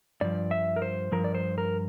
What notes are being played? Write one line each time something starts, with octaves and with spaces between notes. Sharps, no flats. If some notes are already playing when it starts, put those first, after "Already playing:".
G2 F3 D5
E5
A#4
C5
G2 F3 A#4
D5
C5
A#4